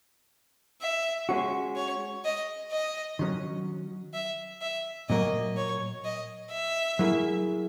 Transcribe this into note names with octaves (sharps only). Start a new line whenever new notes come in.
E5
G#3 C#4 F#4
C#5
D#5
D#5
D#3 F#3 C#4
E5
E5
A#2 F#3 A#3 D#5
C#5
D#5
E5
F#3 A#3 E4 G#4